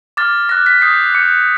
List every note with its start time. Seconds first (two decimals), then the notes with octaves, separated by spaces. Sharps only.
0.17 D6 F6 A6
0.49 D6 F#6 A#6
0.66 B6
0.82 D#6 G6 C7
1.15 D6 G6 C#7